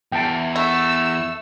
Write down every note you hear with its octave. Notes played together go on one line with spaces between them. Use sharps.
E2 G5 A5
A3 E6